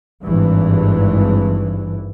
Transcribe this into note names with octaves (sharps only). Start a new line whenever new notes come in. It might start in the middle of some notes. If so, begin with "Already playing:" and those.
G#1 G2 E3